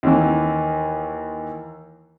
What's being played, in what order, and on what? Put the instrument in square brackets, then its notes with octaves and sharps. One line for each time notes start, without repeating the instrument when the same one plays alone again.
[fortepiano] D#2 D#3 E3